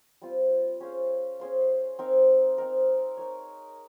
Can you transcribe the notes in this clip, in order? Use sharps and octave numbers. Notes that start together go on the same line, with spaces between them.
G3 C4 F4
C#4 G#4 C5 F5
C#4 G#4 C5 F5
C4 D#4 A#4
C4 D#4 A#4
D#4 A#4 C#5